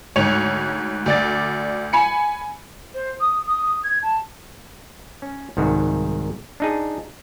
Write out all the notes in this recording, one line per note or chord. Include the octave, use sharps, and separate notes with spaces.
D2 G#2 C#5 C#7 F7
D2 D5 A6
G#5 B5 C#7
C5
D#6
D#6
D#6
G#6
A5
C#4
C2 G#2 D#3 F#4
D4 D#4 G#4